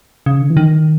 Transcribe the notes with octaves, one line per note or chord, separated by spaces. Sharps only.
C#3
D3
E3
D#3